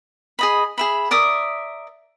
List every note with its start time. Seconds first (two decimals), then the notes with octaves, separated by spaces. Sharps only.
0.39 G#4 D#5 B5
0.78 G#4 E5 B5
1.11 A#4 D5 E5 D#6